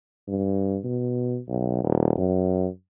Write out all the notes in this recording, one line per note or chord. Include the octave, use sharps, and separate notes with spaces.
G2
B2
B1
D#1
F#2